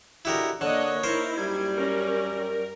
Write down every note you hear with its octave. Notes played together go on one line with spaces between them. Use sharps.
D3 E4 F#4 G4 A#4 D#5
D3 A#3 D4 C#5 D#5 F#6
A#3 D#4 E4 A#4 C5
F#2 G3 G#6
C#4 A#4